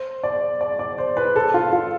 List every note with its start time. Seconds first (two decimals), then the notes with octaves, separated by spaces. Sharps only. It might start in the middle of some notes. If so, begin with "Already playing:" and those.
Already playing: C5
0.23 D5
0.61 D5
0.79 D5
0.98 C5
1.17 B4
1.36 A4
1.54 F4
1.73 F4